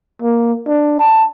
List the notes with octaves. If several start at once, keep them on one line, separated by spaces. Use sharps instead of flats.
A#3
D4
A5